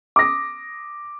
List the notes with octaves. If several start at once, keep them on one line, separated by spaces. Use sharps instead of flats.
D6 D#6 A#6